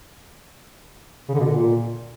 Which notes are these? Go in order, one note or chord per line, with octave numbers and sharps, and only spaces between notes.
C#3
D3
B2
D3
A#2